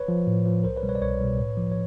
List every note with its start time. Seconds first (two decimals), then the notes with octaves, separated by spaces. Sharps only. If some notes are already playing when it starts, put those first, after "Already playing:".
Already playing: B4 C#5
0.08 F3
0.27 A2
0.46 F3
0.64 C2 A#4 C5
0.77 B4 C#5
0.83 B2 G3
0.89 B4 C#5
0.95 D5
1.02 C2 B4 C#5
1.21 B2 G3
1.39 A2
1.57 F3
1.72 C#5